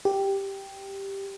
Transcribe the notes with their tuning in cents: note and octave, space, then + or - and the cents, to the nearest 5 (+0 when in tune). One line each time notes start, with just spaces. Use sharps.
G4 +0